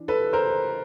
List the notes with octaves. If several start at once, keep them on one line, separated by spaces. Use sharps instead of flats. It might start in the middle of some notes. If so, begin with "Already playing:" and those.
Already playing: E3 D4
A4 B4
A#4 C5